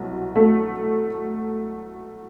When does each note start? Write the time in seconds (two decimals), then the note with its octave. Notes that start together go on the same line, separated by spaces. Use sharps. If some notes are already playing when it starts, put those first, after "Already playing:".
Already playing: C2 B2 F#3
0.36 A3